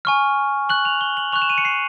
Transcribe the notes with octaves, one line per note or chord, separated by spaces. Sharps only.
G#5 C#6 F6
C#6 F#6 F#7
F7
G7
F#7
C#6 F#6 F7
E7
D#7
C#7
C7